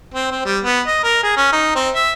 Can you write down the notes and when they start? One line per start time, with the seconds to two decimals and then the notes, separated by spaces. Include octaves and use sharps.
0.14 C4
0.31 C4
0.45 G3
0.64 B3
0.87 D#5
1.04 A#4
1.23 G#4
1.37 C#4
1.52 D#4
1.75 C4
1.95 E5